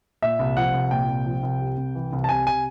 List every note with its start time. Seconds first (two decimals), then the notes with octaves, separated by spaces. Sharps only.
0.22 A#2 E5
0.39 C2
0.57 F3 F#5
0.74 C2
0.91 A#2 G5
1.08 C2
1.26 F3
1.43 C2
1.61 C3
1.77 C2
1.95 E3
2.12 C2
2.24 A5
2.29 C3 G#5
2.47 G#5